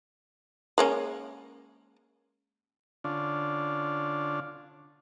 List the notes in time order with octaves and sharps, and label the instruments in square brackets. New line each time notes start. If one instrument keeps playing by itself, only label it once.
[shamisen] G#3 A#3 C#4
[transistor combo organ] D3 C#4 D4 F4